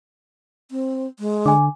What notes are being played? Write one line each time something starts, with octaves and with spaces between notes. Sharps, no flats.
C4
G#3
D3 G#5 D6